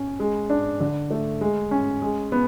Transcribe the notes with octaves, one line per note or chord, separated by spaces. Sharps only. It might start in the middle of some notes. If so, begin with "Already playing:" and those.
Already playing: C#4
G#3
D4
D3
A3
G#3
C#4
G#3
B3